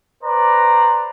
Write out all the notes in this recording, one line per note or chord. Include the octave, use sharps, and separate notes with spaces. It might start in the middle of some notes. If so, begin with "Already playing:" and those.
B4 C5 D5 A#5